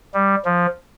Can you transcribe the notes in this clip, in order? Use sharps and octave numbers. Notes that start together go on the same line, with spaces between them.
G3
F3